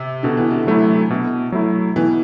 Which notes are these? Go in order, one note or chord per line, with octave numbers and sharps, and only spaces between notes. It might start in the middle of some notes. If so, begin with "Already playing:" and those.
Already playing: C3
B2 D3
E3
D3
F#3 A3 E4
B2
F#3 A3 E4
B2 E3